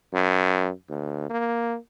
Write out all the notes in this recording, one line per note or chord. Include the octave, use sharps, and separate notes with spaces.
F#2
D2
A#3